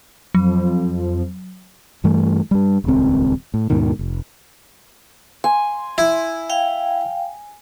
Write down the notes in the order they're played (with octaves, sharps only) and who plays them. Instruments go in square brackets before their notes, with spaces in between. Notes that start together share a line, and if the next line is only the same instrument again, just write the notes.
[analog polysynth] F2 F3 [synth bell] F#3
[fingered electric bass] G2 E3 G3 A3
G2 G3
D#1 C#2 C4
A2
D#2 G#2 B2 D#3
F1
[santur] G#5 [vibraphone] C6
[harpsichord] E4
[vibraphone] F5 G5